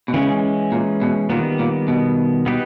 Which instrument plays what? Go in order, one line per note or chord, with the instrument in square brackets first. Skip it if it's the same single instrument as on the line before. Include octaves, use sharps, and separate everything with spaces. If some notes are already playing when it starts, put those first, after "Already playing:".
[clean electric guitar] B2
[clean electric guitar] C#3 [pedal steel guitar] E3 G#3 C#4
[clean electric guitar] A#2
B2
[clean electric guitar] A#2 [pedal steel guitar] D#3 G3 B3
[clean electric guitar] A#2
B2
[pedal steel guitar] B3 D#4 G4 B4